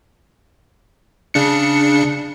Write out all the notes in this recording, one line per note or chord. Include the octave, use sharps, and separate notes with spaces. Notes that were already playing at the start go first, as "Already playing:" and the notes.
C#3 D4 C#7